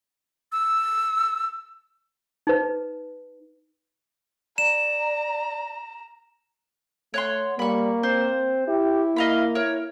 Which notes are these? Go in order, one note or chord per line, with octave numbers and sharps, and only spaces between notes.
E6
D#4 B4
D5 A#5 E7
A3 C#5 F#5 C6
G3 A#3 B5 C#6
C4 C5
E4 G4
A#3 D#5 F5 B5
E4 A#4 C#5